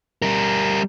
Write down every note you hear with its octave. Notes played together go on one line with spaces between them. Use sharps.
G3 A#4